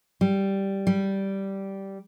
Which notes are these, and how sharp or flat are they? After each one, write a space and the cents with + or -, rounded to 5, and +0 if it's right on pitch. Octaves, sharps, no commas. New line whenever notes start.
G3 -5
G3 -10